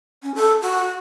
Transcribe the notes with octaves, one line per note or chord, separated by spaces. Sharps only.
C#4
A4
F#4